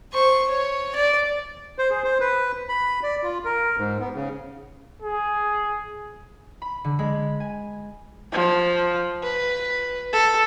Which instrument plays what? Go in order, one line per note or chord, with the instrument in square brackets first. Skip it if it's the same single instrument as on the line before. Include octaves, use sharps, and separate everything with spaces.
[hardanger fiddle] C5 C#6
C#5
D5
[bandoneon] C5
G#4
C5
B4
B5
D5
F4
A#4
G#2
B3
C#3
[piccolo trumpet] G#4
[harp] B5
D3
G#3 B5
G#5
[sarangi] F3
B4
A4